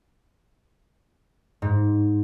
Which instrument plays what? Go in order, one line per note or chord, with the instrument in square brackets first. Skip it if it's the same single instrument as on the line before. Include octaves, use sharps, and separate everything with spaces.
[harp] G#2